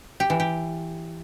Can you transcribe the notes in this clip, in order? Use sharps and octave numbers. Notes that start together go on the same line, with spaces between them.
G4
E3
G4